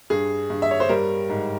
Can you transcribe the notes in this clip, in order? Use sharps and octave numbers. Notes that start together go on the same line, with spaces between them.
G2 G#4
G2
E5
C#5
C5
G3 A#4
G#2